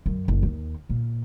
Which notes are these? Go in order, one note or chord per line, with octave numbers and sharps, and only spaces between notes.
F#2
F#1
D#2
A#2